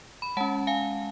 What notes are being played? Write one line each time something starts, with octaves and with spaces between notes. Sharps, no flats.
B5
G#3 C#4 F#5 A5
F5 G#5